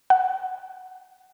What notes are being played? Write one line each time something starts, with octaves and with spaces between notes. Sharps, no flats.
F#5